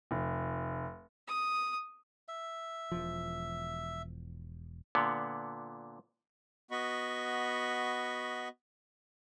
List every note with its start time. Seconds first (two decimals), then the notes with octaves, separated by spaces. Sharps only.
0.11 F1
1.28 D#6
2.28 E5
2.92 E1 F3
4.95 A#2 D3 B3
6.71 B3 F#4 D#5 B5 C#6